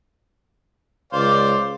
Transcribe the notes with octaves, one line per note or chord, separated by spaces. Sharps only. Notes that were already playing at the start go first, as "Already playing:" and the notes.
C#2 C5 D5 F5